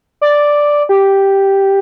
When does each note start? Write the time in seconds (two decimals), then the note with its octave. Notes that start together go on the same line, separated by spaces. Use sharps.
0.21 D5
0.89 G4